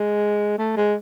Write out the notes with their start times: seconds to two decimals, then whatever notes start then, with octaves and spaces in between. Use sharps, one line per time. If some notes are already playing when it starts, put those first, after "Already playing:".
Already playing: G#3
0.58 A3
0.76 G#3